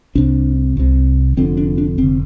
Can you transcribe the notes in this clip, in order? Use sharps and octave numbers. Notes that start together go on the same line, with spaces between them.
C2 C3 D4
C2 C3
F1 F2 D3 C4
D4
D4
F1 D3 C4